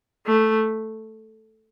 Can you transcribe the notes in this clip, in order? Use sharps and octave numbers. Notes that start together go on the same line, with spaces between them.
A3